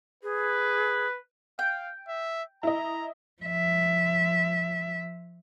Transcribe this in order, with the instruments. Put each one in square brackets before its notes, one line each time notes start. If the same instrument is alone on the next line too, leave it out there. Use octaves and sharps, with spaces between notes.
[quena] G#4 [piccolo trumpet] B4
[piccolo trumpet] F5 [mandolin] G5
[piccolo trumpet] E5
[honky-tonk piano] E4 D#5 [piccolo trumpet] A#5
[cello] F3 E5